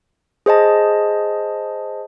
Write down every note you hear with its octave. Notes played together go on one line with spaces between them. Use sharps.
G#4 C5 D#5 A5